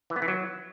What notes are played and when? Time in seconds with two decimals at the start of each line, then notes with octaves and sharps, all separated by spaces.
0.10 E3
0.16 B3
0.22 E3
0.28 F#3